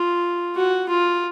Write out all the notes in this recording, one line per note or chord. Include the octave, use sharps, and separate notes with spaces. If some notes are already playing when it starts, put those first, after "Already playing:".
Already playing: F4
F#4
F4